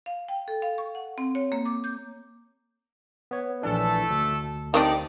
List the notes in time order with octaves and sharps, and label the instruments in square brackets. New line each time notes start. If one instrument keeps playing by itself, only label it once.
[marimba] F5
G5
A4
F5
C#6
F#5
C4
C#5
A#3
D6
G6
[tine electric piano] B3 C#5
[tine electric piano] A#1 E3 D4 [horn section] A3 A4
[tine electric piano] D2
[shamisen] D#3 C4 D4 [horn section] D#4 G4 D5